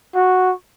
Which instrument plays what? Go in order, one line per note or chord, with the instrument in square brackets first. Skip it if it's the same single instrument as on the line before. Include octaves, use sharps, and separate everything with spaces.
[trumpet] F#4